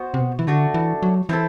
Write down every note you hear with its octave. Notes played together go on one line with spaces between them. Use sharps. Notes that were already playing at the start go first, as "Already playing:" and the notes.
Already playing: B3 F#4 C5
C3
B2
E3
D3 A3 D4 F#4
E3
F#3
E3 C4 E4 A4